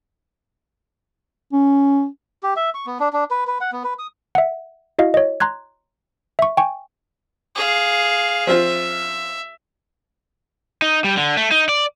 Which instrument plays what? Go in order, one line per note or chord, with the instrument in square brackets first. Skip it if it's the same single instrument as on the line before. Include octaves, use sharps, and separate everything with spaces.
[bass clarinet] C#4
[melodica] G4
E5
C#6
B3
D4
D4
B4
B4
F#5
B3
B4
D#6
[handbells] E5 F#5
E4 F#4 D#5 F5
C#5 D#5
A#5 C6 F#6 G#6
E5 C#6
G5 G#5 C#6
[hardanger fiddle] G#4 F5
[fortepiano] F3 C4 F4 [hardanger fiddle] E5
[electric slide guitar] D#4
G3
D3
A3
D#4
D5